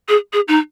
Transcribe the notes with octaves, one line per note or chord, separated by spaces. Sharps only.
G#4
G#4
D#4